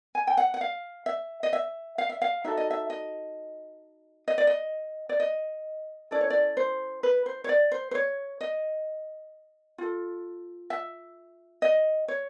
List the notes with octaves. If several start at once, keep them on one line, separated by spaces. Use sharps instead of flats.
G#5
G5
F#5
F#5
F5
E5
D#5
E5
F5
E5
F5
D#4 F#4 A4 E5
D#5
E5
D#5
D#5
D5
D#5
D5
D#5
C#4 E4 A4 D5
C#5
D5
C5
B4
C5
C#5
D5
C5
C5
C#5
D#5
F4 A4
E5
D#5
C#5